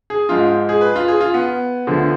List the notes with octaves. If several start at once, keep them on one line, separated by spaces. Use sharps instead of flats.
G#4
G#2 F3 F4
G#4
B4
F4
G#4
F4
B3
D2 D3 F3